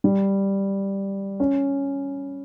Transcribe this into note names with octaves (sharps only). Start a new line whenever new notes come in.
G3
C#4